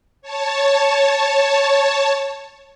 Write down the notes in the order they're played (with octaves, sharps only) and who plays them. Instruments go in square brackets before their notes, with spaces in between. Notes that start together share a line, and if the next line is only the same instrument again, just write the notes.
[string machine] C#5 A5